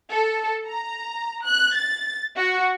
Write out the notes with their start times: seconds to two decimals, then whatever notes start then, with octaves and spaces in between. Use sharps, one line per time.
0.11 A4
0.66 A#5
1.45 F#6
1.76 A6
2.37 F#4